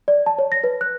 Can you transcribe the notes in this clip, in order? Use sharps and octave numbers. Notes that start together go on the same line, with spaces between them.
D5
A5
C#5
A#6
B4
F#6